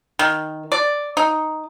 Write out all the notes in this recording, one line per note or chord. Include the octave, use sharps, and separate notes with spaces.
D#3
D5
D#4